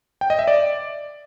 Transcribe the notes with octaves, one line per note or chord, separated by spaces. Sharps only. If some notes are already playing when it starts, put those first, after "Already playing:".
G5
D#5
E5
D5